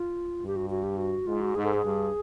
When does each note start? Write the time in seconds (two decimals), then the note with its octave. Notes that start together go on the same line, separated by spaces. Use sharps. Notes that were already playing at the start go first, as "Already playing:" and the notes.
Already playing: F4
0.42 G2 G4
0.56 F#4
0.70 F#4
0.83 G4
0.97 F#4
1.27 G#2 F4
1.41 F#4
1.55 G#2 G#4
1.65 A4
1.74 G#4
1.84 G2